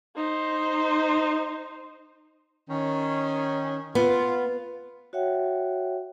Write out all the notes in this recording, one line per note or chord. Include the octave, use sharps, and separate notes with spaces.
D#4 C5
D#3 C#4
B3 F4
F#4 C#5 E5 F#5 G5